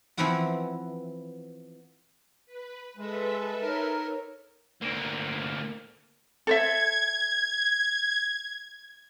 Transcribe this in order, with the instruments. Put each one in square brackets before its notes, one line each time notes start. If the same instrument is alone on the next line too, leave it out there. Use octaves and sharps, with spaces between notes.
[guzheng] E3 F3 B3 C4 E4 F#4
[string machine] B4
[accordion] G#3 [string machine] A4 B4 E5
[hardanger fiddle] D#4 C#5 [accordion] A#4
[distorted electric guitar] D2 A#3
[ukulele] A4 C5 E5 [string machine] G#6